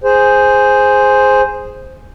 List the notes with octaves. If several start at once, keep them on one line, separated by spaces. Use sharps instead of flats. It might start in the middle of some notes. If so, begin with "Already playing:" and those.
G#4 C5